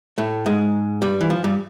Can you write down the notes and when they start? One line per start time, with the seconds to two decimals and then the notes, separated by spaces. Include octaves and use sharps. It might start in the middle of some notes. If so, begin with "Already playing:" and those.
0.18 A2 A3
0.46 G#2 G#3
1.02 G2 G3
1.21 E3
1.30 F3
1.44 G2 G3